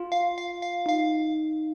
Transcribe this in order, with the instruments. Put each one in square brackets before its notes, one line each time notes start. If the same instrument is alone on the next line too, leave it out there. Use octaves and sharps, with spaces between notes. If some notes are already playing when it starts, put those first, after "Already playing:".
Already playing: [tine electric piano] F4
[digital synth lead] F5
F5
F5
[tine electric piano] D#4 [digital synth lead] F5